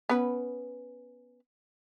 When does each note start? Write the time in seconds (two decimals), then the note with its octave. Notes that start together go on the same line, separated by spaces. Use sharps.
0.09 B3 C#4 B4